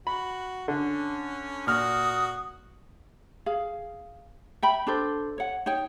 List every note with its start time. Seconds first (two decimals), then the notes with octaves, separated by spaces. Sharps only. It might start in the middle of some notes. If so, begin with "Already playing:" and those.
0.07 F#4 B5
0.68 D3 C#4
1.67 A#2 F#4 D#6 F6
3.46 G#4 F5
4.62 E5 G5 B5
4.87 D4 A4 C5
5.38 C#5 F#5
5.66 D#4 C#5 G5